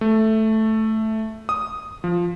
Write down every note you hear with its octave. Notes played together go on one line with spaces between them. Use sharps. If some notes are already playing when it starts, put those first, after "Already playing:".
A3
D#6
F3